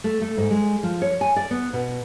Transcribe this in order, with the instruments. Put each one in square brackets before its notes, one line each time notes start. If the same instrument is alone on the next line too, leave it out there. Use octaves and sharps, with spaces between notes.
[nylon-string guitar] A3
A3
G#2
G#3
F3
C#5
G#5
D5
B3
B2